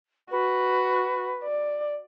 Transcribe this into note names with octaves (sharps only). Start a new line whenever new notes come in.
F#4 B4
D5